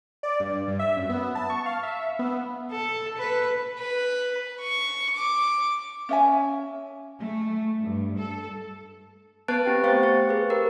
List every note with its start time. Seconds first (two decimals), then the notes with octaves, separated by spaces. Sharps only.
0.23 D5
0.40 G2
0.68 G2
0.79 E5
0.97 F#2
1.09 B3
1.35 A5
1.50 C#6
1.66 F5
1.83 E5
2.19 B3
2.71 A4
3.18 B4
3.79 B4
4.62 C#6
5.17 D6
6.09 C#4 E5 G#5
7.19 A3
7.81 G2
8.18 A4
9.48 B3 B4 A5 F#6 A6 D7
9.66 C4 G4 G5
9.83 A3 C5 F5 C#6 A6
10.03 C#6
10.29 G#4 B4
10.49 G4 A#4 C5